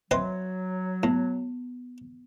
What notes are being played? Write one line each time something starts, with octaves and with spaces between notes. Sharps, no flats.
F#3 C4 B4 D#5 E5 C6
A2 B3